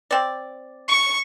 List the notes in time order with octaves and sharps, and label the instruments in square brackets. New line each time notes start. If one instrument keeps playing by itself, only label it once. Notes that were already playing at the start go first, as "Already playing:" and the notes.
[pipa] C4 D5
[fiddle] C#6